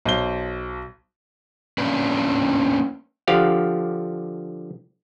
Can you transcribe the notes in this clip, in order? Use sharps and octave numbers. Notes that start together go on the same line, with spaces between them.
B1 C5 G7
A#3 C#4 D4 B4
D3 F3 G4 F5 F#5